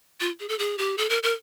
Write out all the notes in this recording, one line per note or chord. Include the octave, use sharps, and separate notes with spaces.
F4
G#4
A4
G#4
G4
A4
A#4
A#4